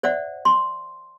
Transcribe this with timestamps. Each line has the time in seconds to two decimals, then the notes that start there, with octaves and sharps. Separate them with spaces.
0.03 C5 D5 E5 F#5
0.45 C6